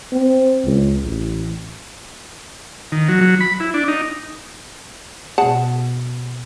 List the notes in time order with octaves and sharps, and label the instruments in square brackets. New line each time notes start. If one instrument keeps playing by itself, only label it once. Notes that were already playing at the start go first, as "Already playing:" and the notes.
[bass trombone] C4
C#2
A1
[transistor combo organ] D#3
F#3
F#3
B5
E4
D4
D#4
[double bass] B2 [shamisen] G#4 F#5 A5